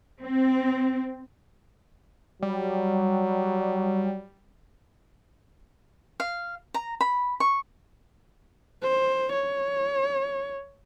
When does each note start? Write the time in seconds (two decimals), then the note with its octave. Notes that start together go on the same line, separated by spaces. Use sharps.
0.22 C4
2.42 F#3 G3
6.20 F5
6.74 A#5
7.01 B5
7.40 C#6
8.83 C5
9.33 C#5